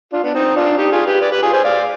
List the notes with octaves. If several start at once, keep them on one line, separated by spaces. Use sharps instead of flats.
D4 F4
B3 D4
C4 D#4
D4 F4
D#4 G4
F4 G#4
G4 B4
B4 D5
G4 B4
F4 G#4
G#4 C5
D5 F5